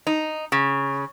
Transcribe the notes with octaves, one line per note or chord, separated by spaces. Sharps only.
D#4
C#3